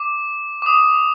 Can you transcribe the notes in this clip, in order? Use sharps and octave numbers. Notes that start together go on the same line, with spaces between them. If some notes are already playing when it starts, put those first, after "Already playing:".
Already playing: D6
D6
D#6